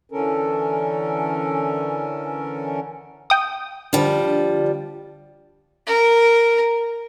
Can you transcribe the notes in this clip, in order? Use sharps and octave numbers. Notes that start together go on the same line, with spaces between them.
D3 E3 C#4 A4 A#4
G5 D#6
D3 F3 G3 C5
A#4